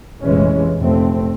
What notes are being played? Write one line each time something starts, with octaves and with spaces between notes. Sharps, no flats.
F1 A#1 E3 G#3 C#4
F1 A3 C4